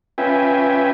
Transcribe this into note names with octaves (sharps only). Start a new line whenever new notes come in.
C#4 F4 B4 E5 G5 G#5